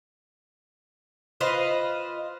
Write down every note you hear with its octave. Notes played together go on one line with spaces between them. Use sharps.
F4 B4 C5 D#5